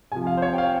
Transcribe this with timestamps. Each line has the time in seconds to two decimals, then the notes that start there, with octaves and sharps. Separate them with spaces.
0.12 C3 F3 G#5
0.27 F5
0.37 C5
0.42 C#5
0.53 G5
0.58 F5